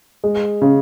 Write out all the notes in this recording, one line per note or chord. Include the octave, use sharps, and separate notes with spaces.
G#3
C#3